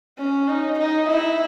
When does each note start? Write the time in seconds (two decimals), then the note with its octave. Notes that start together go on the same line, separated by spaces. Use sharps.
0.18 C#4
0.48 D#4
0.79 D#4
1.09 E4